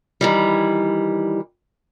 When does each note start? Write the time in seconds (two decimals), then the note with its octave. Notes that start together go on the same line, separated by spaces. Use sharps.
0.21 D#3 E3 G3